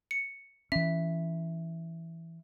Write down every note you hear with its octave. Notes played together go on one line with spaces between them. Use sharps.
C#7
E3 C#4 E5